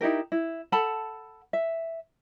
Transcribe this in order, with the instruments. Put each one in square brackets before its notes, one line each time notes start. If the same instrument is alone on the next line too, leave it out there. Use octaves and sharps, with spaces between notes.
[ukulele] D#4 E4 G4 A#4
E4
A4 F#5 A5 B5
E5